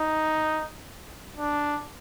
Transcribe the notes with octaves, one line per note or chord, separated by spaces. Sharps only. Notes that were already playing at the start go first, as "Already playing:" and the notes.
Already playing: D#4
D4